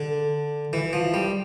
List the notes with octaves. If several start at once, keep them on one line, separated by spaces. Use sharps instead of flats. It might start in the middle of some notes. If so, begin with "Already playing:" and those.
Already playing: D3
E3
F3
G3